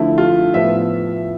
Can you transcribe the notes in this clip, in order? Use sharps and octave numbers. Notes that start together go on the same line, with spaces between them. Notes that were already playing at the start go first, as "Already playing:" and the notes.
Already playing: D3 F3 A3 E4
F4
A2 F3 B3 E5